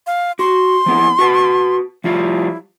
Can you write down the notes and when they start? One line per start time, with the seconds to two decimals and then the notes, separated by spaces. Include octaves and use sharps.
0.07 F5
0.39 F#4 C6
0.86 F3 B3 E4
1.19 F#4 B4 A5
2.04 F3 G3 E4 F4